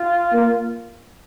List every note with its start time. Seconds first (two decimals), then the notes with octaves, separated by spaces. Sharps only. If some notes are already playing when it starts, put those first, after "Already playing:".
Already playing: F4
0.32 A#3